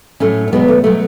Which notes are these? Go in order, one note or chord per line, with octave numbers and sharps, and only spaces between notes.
A2 F#3 A3 C#4
C#4
E2 B2 F#3 G#3 B3
A3
B2 F#3 A3